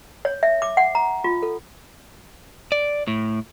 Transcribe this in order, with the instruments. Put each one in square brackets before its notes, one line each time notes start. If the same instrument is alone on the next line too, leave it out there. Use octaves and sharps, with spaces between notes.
[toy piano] C#5
E5
D6
F#5
A#5
F4
A4
[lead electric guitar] D5
A2